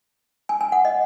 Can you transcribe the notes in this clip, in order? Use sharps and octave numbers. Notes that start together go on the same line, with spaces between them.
G#5
G#5
F#5
D#5